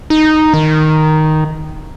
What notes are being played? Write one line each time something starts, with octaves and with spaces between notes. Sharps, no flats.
D#4
D#3